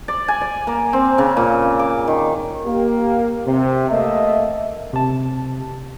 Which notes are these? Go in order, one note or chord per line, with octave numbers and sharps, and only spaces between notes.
D5
G#5
D5
A#3
C4
C#3
A#2
D6
D#3
A#3 G4
C3
A3 A#3 D#5 E5
C3 A5